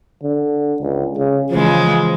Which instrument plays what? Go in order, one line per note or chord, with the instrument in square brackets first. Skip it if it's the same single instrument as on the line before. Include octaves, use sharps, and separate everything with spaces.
[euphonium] D3
C#2
C#3
[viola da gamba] C#3 E3 G#3 [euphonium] F3